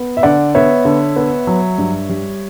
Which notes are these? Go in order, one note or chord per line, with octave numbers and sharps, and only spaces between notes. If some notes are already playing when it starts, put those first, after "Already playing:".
Already playing: B3
E5
D3 D5 F#5
B3 C#5 E5
D3
B3
F#3
G2
G3